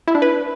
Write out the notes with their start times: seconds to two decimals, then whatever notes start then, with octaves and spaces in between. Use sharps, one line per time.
0.07 E4
0.15 D4
0.22 B4